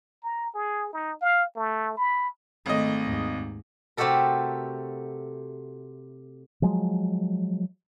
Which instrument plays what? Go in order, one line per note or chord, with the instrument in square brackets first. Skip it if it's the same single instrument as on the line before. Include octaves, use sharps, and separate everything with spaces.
[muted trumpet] A#5
G#4
D#4
F5
A3
B5
[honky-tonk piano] G#1 D#5 [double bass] D#3 A3
[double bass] D#2 G#2
[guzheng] C3 A3 F#4 G4 A4 A#4
[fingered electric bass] F3 F#3 G#3